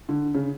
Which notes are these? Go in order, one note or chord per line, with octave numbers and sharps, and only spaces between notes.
D3
C#3